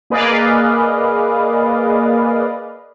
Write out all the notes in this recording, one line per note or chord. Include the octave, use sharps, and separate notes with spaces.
A#3 G#4 B4 D5 D#5 F5